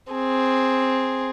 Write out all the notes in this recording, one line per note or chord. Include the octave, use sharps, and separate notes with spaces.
C4 G#4